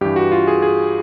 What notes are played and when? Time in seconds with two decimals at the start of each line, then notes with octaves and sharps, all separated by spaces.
0.01 G2 E3 G4
0.16 F#4
0.32 F4
0.47 G#4
0.62 G#4